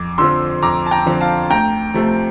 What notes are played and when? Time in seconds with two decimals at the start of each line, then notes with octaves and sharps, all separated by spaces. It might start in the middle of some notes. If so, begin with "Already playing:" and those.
Already playing: F2 D6
0.18 D3 F3 C4 C6 E6
0.62 F2 A#5 D6
0.86 A5
0.91 G5 A#5
1.06 D3 F3 C4
1.21 F5 A5
1.50 D2 G5 A#5
1.94 C3 F3 A3 C4